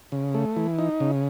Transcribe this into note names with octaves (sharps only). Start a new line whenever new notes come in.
C#3
A3
E3
D#4
C#3